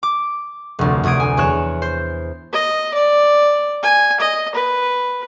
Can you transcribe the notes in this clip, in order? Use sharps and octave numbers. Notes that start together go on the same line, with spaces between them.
D6
F1 D2
F1 D2 D#6 G#6 D7
G#5
E2 C#5 F#6 E7
C5
D#5
D5
G#5
D#5
B4